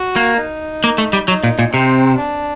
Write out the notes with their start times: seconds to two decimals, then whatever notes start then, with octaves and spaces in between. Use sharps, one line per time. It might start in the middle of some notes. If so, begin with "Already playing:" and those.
Already playing: F#4
0.16 A#3
0.38 D#4
0.84 A#3
0.98 A3
1.13 G3
1.28 F#3 D#4
1.44 A#2
1.59 A#2
1.73 C3 C4
2.18 D4